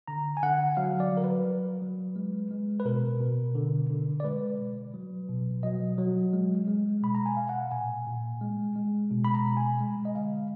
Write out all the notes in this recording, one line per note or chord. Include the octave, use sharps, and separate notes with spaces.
D3 A#5
G#5
D3 F#5
F#3 F5
D5
F#3
A#4
B4
F#3
F#3
G#3
G#3
B4
B2 A#4
B2
D3
D3
D5
G#3 B4
B2
F#3
B2
F#3 D#5
F#3
G#3
G#3
B2 B5
A#5
G#5
B2 F5
F#5
A#2 G#5
A#2
G#3
G#3
B2
B5
A#5
B2
G#5
G#3
D#5
D3 F5